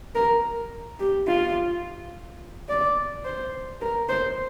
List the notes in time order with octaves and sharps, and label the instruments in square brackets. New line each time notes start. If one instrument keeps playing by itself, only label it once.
[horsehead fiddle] A#4
G4
F4
D5
C5
A#4
C5